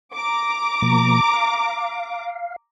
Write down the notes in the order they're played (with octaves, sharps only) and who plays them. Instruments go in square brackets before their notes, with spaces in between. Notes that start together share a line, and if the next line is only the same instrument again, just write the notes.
[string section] A#5 D6
[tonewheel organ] B2 F3 A#3
F5